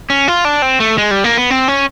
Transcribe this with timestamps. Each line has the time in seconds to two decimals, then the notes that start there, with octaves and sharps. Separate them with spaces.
0.10 C#4
0.28 F4
0.45 D4
0.62 C4
0.80 A3
0.98 G#3
1.11 G3
1.24 A#3
1.37 B3
1.51 C4
1.68 C#4